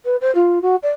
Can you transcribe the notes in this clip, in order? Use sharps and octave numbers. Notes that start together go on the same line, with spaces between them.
B4
C5
F4
F#4
D5